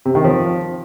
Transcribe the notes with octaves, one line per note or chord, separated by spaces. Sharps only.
C3
D#3
F3